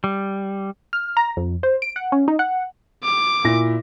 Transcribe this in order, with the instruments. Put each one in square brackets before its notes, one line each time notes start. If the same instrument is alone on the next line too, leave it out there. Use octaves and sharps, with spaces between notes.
[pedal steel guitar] G3
[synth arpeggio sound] F6
A#5
F2
C5
D7
F#5
C#4
D#4
F#5
[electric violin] D6
[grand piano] A#2 E4 A#6